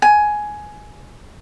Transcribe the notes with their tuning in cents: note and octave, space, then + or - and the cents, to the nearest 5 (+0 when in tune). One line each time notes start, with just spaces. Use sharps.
G#5 +10